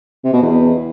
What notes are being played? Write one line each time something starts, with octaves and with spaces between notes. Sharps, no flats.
C3
B2
E2